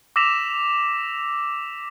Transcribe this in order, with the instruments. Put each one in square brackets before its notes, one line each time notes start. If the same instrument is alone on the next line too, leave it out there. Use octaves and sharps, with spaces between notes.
[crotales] D6 E6 A#6 B6 E7 F7